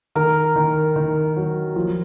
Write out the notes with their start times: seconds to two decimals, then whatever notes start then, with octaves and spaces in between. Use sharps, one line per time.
0.15 D#3 A#4
0.56 D#3
0.96 D#3
1.36 F#3
1.76 F3